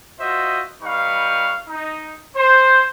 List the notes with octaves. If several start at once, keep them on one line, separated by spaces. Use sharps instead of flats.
F4 F#4 C5 D#5 E5
G3 D#4 B4 F5 C#6
D#4
C5